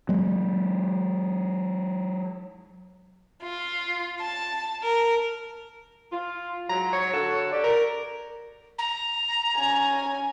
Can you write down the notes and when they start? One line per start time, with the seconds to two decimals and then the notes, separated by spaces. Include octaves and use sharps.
0.09 F#3 G#3
3.43 F4
4.21 A5
4.83 A#4
6.12 F4
6.69 G#2 F#3 A#5
6.93 C#5
7.13 D3 F#4 A4
7.52 G4 D5
7.64 A#4
8.78 A#5
9.56 C#4 G#5